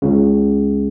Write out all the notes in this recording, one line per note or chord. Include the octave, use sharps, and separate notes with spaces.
C#2 C#3